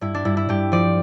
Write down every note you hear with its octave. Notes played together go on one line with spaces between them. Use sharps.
G2 E4
D4
G2 E4
E4
G2 G4
F3 D5